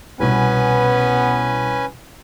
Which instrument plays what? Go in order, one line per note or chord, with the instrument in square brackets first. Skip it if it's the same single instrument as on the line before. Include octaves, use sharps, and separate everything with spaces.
[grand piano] C2 B2 [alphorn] B3 [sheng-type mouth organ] C#4 B4 G#5